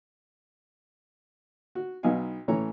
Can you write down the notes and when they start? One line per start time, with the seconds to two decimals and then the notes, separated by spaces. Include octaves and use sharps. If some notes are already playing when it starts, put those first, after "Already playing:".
1.75 F#4
2.03 B1 B3 D#4 F5 G#5
2.48 A2 E3 A3 C#4 C#5 A#5